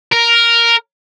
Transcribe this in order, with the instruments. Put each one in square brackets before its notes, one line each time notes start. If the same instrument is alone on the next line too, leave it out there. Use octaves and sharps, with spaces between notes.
[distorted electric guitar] A#4